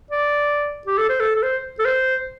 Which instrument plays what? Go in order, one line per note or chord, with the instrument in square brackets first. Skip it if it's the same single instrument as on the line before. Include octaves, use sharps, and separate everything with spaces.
[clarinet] D5
G4
A4
C5
A4
A4
C5
A4
C5